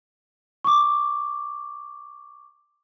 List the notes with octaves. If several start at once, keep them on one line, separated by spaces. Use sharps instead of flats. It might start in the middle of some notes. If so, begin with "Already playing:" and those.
C#6 D6